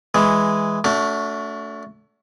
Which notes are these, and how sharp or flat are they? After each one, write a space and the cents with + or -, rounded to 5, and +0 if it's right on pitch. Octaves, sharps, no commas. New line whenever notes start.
E3 +0 G#3 +0
A3 +5 D4 -45 F#4 +0